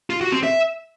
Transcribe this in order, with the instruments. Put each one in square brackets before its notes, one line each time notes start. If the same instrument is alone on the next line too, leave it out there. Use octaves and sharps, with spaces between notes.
[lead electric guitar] F4
F#4
C4
E5